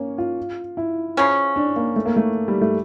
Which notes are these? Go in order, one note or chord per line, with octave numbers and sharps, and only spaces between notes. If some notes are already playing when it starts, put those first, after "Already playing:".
Already playing: A#3 C#4
F4
E4
C#3 F3 C#4
D4
A#3
A3
A#3
A3
G3
A3